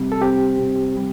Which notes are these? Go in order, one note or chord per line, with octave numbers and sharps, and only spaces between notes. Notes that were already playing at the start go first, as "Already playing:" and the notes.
Already playing: C3 G3
A4
C4 G4
C3
G3